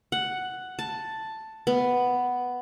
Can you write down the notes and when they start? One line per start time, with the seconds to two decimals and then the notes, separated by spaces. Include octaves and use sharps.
0.12 F#5
0.79 A5
1.67 B3